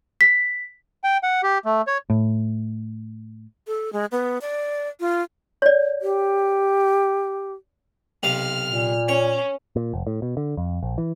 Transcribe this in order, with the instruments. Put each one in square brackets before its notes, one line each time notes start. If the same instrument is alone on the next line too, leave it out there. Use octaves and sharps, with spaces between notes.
[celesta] B6
[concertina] G5
F#5
G4
A3
C#5
[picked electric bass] A2
[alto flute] A4
G#3
B3
D5
F4
[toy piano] C#5 D5
[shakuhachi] G4
[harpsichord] B1 C3 F5 [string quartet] F6
[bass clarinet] A#2
[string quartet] C#4 [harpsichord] C#5
[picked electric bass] A#2
F1
A2
B2
D3
F2
A#1
E3